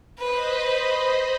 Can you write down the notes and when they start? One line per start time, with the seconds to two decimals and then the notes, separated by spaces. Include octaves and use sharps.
0.18 B4 C5 D#5 B5